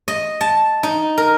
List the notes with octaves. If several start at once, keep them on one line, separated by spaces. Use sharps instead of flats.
D#5
A5
D#4
A#4